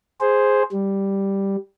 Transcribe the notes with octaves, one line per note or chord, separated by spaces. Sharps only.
G#4 C5
G3